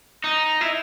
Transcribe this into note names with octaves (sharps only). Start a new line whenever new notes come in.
D#4
E4